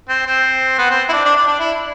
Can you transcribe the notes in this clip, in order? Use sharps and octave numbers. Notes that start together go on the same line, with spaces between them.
C4
C4
B3
C4
E4
D4
D4
D4
D4
E4